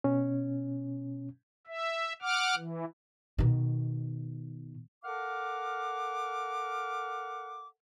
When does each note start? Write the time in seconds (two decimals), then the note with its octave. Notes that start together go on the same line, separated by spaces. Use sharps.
0.04 B2 C#4
1.67 E5
2.22 F#5 D6 F6
2.56 E3
3.38 B2 D#3
5.05 A4 A#4 F5 F#5 D6